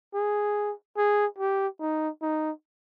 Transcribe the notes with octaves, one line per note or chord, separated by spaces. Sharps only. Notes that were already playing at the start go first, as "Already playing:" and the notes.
G#4
G#4
G4
D#4
D#4